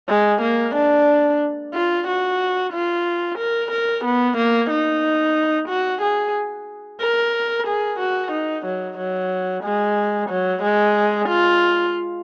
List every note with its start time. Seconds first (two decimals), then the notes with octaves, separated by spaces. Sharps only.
0.09 G#3
0.41 A#3
0.75 D4
1.74 F4
2.07 F#4
2.73 F4
3.39 A#4
3.71 A#4
4.05 B3
4.37 A#3
4.70 D#4
5.69 F#4
6.02 G#4
7.01 A#4
7.67 G#4
7.99 F#4
8.32 D#4
8.66 F#3
8.98 F#3
9.64 G#3
10.30 F#3
10.63 G#3
11.29 F4